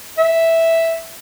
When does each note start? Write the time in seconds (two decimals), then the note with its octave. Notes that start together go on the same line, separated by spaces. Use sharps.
0.17 E5